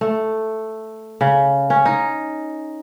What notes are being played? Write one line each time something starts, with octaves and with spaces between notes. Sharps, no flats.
A3
C#3
C#4
D#4